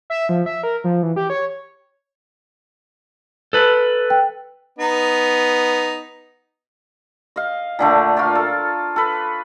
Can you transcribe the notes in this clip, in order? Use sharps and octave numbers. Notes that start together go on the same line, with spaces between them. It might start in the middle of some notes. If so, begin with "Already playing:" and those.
E5
F3
E5
A#4
F3
E3
G4
C#5
A4 B4
G5
B3 D#4
D#5 F5
A#2 D3 A3
F4 A#4 C#5 D5
A4
A4 B4